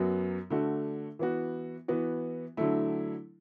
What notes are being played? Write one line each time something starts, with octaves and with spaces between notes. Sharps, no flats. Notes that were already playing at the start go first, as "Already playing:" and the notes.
Already playing: F#2 F#3 B3 F#4
D3 A3 F#4
E3 B3 F#4
E3 B3 F#4
D3 F#3 A3 E4